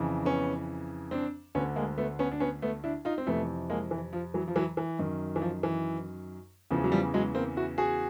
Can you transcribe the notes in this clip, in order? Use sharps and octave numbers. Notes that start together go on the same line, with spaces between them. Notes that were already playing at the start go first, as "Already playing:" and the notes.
Already playing: F2 C#3 E3
B3 C#4
C4 D4
D2 D3 B3 C#4
G#3 A#3
A3 B3
B3 C#4
D4
B3 C#4
A3 B3
D4 E4
D#4 F4
C4
F2 C3 E3 A3 B3
G#3 A#3
E3
F3
E3 F#3
F3
E3 F#3
E3
F#2 D#3
E3
F3
E3
E2 C#3 E3 F3
F#3
F3 G3
F#3 G#3
A#3 C4
E4 F#4
F#4 G#4